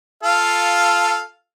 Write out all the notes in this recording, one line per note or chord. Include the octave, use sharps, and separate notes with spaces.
F4 A4 F5